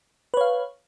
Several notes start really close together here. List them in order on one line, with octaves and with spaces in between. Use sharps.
B4 C#5 F5